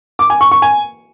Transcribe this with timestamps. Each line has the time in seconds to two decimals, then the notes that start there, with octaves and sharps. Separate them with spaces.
0.19 D6
0.30 G#5
0.41 C#6
0.51 C#6
0.62 G#5